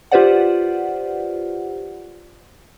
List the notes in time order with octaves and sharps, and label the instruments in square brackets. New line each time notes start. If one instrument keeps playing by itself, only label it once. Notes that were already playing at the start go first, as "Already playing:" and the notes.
[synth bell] F4 G4 B4 C5 D5 F#5